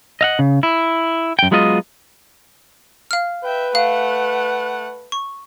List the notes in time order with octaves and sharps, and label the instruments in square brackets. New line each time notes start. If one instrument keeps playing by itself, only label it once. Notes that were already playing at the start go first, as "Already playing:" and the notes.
[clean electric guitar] D#5 F5 F#5
C#3
E4
F#2 G5
F#3 G#3 B3 F4 C#5 D#5
[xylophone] F5 F6
[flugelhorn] B4 [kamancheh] E5 G5
[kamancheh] A3 F#5 [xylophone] F5
[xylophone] C#6